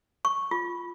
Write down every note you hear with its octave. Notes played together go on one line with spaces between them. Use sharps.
C#6
F4